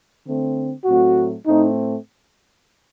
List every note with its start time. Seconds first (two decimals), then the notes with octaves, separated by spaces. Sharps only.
0.24 D3 A3 C4
0.85 A2 F#3 A3 C4 F#4
1.46 A2 A3 C4 D#4